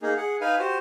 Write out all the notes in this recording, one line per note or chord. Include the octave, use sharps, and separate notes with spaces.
A#3 D#4 G#4
G#4 F#5
D#4 B4 F5 G#5
F#4 G4 C5